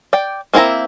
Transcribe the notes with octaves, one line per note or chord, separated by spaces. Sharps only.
D5 G5
A#3 C4 E4 G#4 A#5